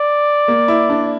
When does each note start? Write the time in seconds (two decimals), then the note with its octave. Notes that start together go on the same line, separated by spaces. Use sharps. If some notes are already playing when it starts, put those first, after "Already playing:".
Already playing: D5
0.48 A#3
0.68 E4
0.90 D4